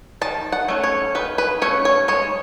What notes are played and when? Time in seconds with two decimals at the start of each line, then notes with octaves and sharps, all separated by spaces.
0.21 D#3 A5
0.52 F#5
0.68 A3 C#4
0.84 C#5
1.15 D#3 B4
1.38 B4
1.62 A3 C#4 C#5
1.85 C#5
2.08 G#3 C#5